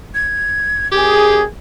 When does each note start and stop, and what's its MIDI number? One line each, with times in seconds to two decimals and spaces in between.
0.15 0.90 92
0.92 1.42 42
0.92 1.40 67
0.92 1.42 68
0.92 1.43 92